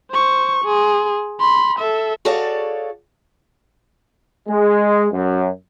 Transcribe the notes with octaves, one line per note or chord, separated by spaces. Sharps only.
C5 C#6
G#4 C6
B5 C6
A4 E5
F#4 G#4 A4 C#5 D5 F5
G#3
F#2